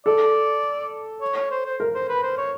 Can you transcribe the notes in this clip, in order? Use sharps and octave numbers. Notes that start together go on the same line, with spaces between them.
A4 D5
C#5
C#5
C5
C5
A#4
C5
B4
C5
C#5